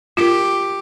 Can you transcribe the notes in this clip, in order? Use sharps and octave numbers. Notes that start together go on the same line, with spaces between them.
F4 G4 A#4